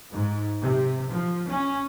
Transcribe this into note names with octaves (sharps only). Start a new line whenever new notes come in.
G#2
C3
F3
C#4